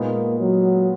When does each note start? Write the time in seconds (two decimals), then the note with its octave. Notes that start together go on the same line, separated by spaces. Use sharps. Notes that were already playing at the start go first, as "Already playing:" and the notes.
Already playing: A#2 G#3 A#3 B3 D#4
0.39 F#3